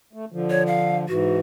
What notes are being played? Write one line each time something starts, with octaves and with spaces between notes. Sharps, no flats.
A3
D3 F3
C#5
F5
G#2 E3 F#4